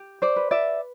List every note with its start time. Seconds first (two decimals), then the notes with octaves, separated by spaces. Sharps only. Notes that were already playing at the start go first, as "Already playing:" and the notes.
Already playing: G4
0.22 C5 D5
0.36 B4
0.51 D5 E5